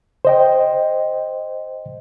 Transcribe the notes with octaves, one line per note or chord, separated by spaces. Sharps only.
C5 D#5 G5